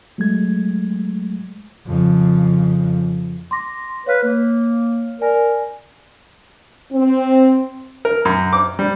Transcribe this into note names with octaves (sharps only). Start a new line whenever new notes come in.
F#3 G#3 A3 G#6
F2 C#3
C6 D6 A#6
B4 C#5 F5 F6
A#3
A#4 D5 G#5
C4
A#4
F#2
D6
G3